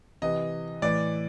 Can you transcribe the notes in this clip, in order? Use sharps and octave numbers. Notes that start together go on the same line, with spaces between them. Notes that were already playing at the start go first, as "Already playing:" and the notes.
C3 E3 D#5
A2 E3 D5